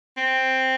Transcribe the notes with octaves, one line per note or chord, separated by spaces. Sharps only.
C4